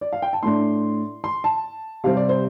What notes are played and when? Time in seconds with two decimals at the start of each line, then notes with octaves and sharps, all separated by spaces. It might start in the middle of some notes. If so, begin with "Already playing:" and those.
0.01 D5
0.13 F5
0.22 G5
0.33 A5
0.43 A2 A3 D4 C6
1.24 C6
1.44 A5
2.04 C3 G3 C4 F5
2.17 D5
2.29 C5